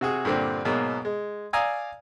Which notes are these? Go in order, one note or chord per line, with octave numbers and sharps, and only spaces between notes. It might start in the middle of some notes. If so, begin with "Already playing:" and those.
C3 F#4 G#4
G2 A#2 D3 C4
G#2 B2 F#3 A#3
G#3
D5 F5 G#5 A#5 D#6 E6